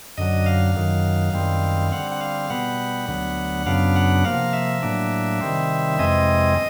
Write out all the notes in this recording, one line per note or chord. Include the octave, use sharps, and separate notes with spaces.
F#2 D3 F#3 D#5
F5
F#2 D#3 F#3
F#2 D#3 G3 C4
D3 G3 C4 F#5
F#5
F5
B2 G3 B3 F#5
D2 D3 F#3 B3
F#2 C#3 F#3 B3 D4 F5
F#5
C3 F3 A#3 F5
E5
A2 F#3 A#3 D4
C3 D#3 G3 C4
F2 C3 E3 G#3 C4 D#5